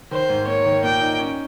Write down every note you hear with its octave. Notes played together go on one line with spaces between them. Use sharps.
D#3 C5
G#2
A#3 C#5
D#3
A#2 G5
D#4
C#4